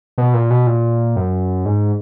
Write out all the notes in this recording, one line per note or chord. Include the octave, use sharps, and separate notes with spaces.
B2
A#2
B2
A#2
F#2
G#2